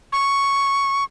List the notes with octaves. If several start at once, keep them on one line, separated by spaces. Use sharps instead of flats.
C#6